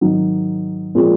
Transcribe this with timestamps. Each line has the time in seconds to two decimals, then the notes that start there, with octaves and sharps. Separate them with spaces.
0.01 G#2 D#3 F#3 C4 D#4
0.95 A#2 F3 G#3 C4